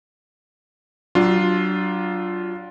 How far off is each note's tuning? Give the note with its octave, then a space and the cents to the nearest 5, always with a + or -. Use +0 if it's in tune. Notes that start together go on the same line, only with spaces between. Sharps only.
F#3 +25 D4 +0 F4 +0